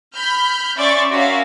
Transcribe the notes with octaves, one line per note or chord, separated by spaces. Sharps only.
B5 F6 G6
C#4 D5 E5 C6 C#6 A6
C#4 F#4 A#4 C#5 E5 F5